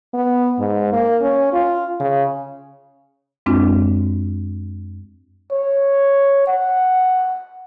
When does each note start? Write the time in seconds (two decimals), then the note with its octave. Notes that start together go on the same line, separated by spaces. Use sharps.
0.14 B3
0.59 G#2
0.92 A#3
1.22 C#4
1.53 F4
2.00 C#3
3.46 F#2 G#3 C4 D4 E4 F4
5.52 C#5
6.48 F#5